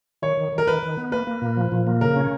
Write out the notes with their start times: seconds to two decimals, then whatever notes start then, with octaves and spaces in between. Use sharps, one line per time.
0.22 D#3 C#5
0.37 D#3
0.52 D#3
0.58 A#4
0.67 D#3 B4
0.82 D#3
0.97 B3
1.12 A#3 B4
1.27 A#3
1.42 A#2
1.57 F3
1.72 A#2
1.87 A#3
2.01 C#3 A#4
2.16 C#4